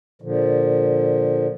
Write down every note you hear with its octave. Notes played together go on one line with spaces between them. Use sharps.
A#2 D3 F3